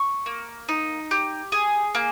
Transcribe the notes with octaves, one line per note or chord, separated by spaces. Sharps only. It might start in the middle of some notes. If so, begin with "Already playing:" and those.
Already playing: C#6
A#3
D#4
G4
G#4
A#3